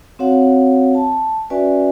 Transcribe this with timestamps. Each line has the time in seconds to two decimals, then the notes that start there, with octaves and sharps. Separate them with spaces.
0.19 C4 F#4 C#5 F5 F#5
0.95 A5
1.50 C#4 F#4 B4 D5 E5 G#5